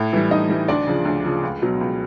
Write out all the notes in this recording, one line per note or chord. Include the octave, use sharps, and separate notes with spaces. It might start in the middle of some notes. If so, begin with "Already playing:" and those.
Already playing: A2
E3 G3
A2 D#4 D#5
E3 G3
D2 D4 D5
C#3 F3
D2
C#3 F3
C#2
B2 F#3
C#2